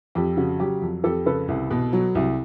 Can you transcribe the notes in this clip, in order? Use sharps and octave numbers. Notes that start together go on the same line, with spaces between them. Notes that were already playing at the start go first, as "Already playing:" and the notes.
F2 G4
C#3 F#4
F#3 G4
F2
F2 G4 A4
C#3 A4 B4
C2
B2
F#3
C2